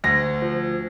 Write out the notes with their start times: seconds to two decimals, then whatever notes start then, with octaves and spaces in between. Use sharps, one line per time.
0.04 D2 A#6
0.42 F3